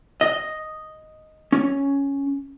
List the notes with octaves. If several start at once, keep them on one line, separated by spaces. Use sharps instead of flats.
D#5
C#4